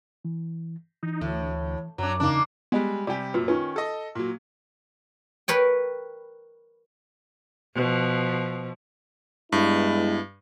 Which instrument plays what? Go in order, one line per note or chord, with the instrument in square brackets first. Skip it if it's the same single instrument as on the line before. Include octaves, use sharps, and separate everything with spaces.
[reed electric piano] E3
[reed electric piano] E3 [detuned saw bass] D#4
[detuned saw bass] D2 [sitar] A2
[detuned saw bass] F#2 [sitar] F#3 D4
[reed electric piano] E2 C#3 D#4 [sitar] A#3 D4
[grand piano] G3 G#3 [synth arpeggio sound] B3 D#5 F#6
[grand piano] C3 G3 G4 [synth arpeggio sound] D5 G#5
[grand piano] F#2 A#2 [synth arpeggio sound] F4 B4
[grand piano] D#3 C#4 [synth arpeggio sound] D#4 F4 B4
[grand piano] A4 D#5
A#2 F#3
[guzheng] A#4 B4 C#5 G5
[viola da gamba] B2 F3
[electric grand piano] G2 [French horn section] G#3 B3 E4